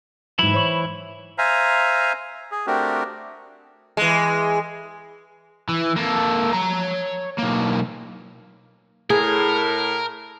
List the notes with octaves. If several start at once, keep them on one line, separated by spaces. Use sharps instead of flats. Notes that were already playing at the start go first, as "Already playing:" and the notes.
G#2 E3 F#3 E4 B5
C5 C#5 C#6
C5 E5 F5 G#5 A#5
G#4
A3 C4 D4 F#4 G4 A#4
E3 G#3
E3
A#3 A4
C#5 A#5
B1 A#3
A2 G#4 A#4